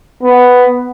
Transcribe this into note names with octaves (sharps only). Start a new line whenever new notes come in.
B3